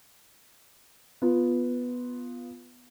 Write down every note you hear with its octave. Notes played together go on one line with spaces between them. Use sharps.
B3 F4